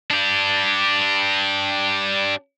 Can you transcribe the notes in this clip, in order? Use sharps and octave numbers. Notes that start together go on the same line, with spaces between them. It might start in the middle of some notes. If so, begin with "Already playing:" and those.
D4 G4